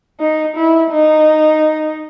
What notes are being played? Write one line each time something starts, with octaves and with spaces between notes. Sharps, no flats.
D#4
E4
D#4